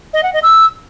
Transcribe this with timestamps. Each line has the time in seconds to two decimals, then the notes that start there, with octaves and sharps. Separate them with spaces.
0.13 D#5
0.23 F#5
0.33 D#5
0.43 E6